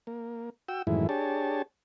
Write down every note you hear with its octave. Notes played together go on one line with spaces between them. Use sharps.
A#3
F#4 G5 E6
F#2 A2 D#3 E3 G#3 E4
D4 G4 G#4 C#5 A5